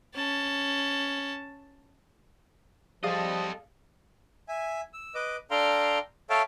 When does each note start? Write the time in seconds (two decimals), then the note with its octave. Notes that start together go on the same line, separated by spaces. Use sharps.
0.14 C#4 A5
3.03 F3 G3 G#4 A4 D5 D#5 F5
4.49 E5 G#5
4.94 E6
5.15 B4 D#5 D6
5.51 D4 A4 F5 G5 A#5 C6
6.30 A4 C#5 E5 F5 G5 A5